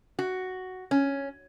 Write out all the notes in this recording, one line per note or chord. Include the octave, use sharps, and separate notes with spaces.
F#4
C#4